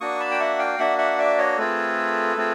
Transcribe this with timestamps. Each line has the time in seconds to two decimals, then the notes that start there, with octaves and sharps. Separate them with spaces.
0.01 A#3 D4 F#4 C#6 D#6
0.20 A5 B5
0.31 G5
0.40 E5 F#5
0.59 F5 G5
0.78 A#3 D4 F#4 E5 F#5
0.98 E5 F#5
1.18 D5 E5
1.38 C#5 D#5
1.57 A3 C4 F4 G#4 A4 B4
2.36 A3 C4 F4 G#4